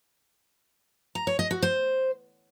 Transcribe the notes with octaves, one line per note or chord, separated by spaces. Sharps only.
A#5
C#5
D#5
F#4
C5